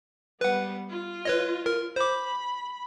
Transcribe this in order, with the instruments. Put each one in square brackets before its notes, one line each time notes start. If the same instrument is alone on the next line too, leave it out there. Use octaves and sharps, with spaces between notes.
[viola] G3 B3 [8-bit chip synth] B4 F#5
[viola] F4
[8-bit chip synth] B4 C#5 D#5
A#4
[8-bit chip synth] C5 D6 [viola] B5